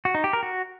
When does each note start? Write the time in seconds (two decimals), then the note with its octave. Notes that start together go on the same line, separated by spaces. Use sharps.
0.05 F#4
0.15 D#4
0.24 G4
0.33 A#4
0.43 F#4